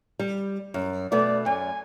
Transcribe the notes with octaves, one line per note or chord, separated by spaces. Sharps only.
G3
F#2
B2 A3 B3 D5
F#2 G#5